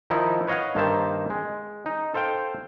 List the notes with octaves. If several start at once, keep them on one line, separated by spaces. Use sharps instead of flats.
D#3 F3 D#4 E4
B4 C#5 D#5 F5 F#5
G2 D#3 A#3 C5 E5 A5
G#3
D#4
A4 C5 F5 G5